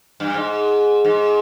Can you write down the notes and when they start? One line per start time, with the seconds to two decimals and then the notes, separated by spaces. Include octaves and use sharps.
0.20 G2
0.34 G#2
1.05 G#2